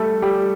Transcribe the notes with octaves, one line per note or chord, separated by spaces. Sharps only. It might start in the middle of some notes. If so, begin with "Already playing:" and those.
Already playing: G3 A3 A4
G3 G4